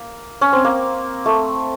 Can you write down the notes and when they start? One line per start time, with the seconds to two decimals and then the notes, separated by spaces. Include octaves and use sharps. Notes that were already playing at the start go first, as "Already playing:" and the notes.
Already playing: A#3
0.41 C#4
0.53 C4
0.65 A#3
1.26 A3